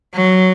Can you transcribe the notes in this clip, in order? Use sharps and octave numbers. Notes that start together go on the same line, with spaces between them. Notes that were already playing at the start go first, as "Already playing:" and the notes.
F#3